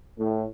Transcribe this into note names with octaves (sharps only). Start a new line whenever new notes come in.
A2